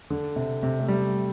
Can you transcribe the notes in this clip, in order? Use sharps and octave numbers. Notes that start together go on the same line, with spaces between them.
D3
C3
C3
A3
G3